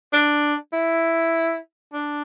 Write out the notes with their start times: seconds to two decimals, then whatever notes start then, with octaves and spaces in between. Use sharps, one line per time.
0.13 D4
0.73 E4
1.93 D4